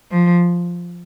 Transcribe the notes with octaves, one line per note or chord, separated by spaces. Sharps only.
F3